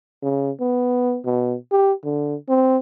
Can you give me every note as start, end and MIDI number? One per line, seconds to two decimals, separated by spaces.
0.23 0.51 49
0.60 1.19 59
1.25 1.55 47
1.72 1.93 67
2.04 2.35 50
2.49 2.77 60